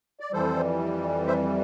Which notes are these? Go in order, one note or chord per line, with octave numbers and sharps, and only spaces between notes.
D5
F2 E3 G3 A4 C5
C5 E5